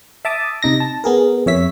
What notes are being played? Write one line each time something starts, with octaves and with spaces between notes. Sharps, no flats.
E5 A5 D6 D#6
C3 D#4 A#6
A5
B3 G#4 A#4
F2 C#5 E5 B6